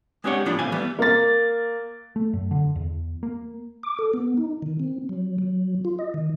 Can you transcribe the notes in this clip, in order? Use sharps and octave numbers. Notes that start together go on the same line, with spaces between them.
G#3 C4 D4 G4 C#5 F#5
A2 F3 D4 F4 B5
A2 E3 C4 E4 F5 G#5
E3 G3 A3 B3
A#3 A6
A3
F#2
D3
E2
A#3
D6
A4
B3
D#4
D#3
C4
F#3
F#3
F4
D#5
D#3